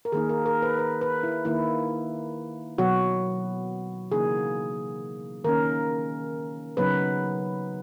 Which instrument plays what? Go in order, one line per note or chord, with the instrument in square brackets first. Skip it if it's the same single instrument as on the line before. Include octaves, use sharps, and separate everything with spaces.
[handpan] A#4
D#3 A#3 D#4 G#4
A#4
A#4
B4
B4
B4
E4
D#3 A#3 D#4 E4
B2 F#3 B3 F#4
C#3 E3 A#3 D#4 G#4
D#3 A#3 C#4 A#4
C#3 F#3 B3 D#4 B4